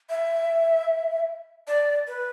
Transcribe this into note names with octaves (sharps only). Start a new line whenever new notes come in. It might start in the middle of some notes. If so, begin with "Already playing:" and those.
E5
D5
B4